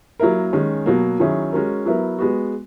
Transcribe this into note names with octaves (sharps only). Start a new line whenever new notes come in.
F#3 A#3 E4 A#4
D#3 G#3 C#4
B2 F#3 A#3
D#3 F#3 C#4 E4 G#4
G#3 C#4 F#4 A#4
F#3 B3 E4 A#4
G#3 B3 F#4